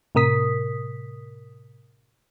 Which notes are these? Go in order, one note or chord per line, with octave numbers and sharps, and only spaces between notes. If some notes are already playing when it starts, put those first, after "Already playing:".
A2 C3 A#4 D#6 B6